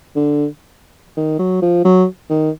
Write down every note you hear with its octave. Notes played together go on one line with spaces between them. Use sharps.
D3
D#3
F#3
F3
F#3
D#3